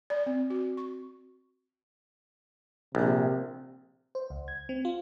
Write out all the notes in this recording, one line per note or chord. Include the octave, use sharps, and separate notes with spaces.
D5
C4
F#4
C#6
A#1 C3
C5
C#2
G#6
C4
F4